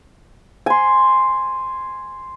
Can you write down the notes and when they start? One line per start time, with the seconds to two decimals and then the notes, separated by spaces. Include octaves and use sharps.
0.66 G#5 C6